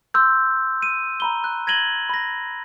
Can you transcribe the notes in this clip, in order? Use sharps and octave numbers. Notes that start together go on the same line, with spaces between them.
C6 E6 F6 G6
D#7
A#5 B5 G7
F#6
G#6 A#6 D#7 F#7 G7
B5 A#6